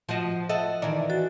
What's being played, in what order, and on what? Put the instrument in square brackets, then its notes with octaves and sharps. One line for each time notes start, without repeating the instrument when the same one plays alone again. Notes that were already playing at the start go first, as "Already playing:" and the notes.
[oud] F3 F#4 D#5
[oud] A4 [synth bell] D#5 E5 F#5
[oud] D#3 E3 [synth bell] D5
[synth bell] F#4 A6